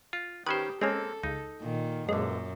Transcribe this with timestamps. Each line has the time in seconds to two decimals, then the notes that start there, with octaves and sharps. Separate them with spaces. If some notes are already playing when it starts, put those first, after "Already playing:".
0.13 F4
0.46 D#3 C#4 G4 B4 C5
0.81 G#3 A#3 C4 C#4 A4
1.23 C#2 D#4
1.61 A#2 D#3
2.09 B1 F#2 A#2 D3 G#3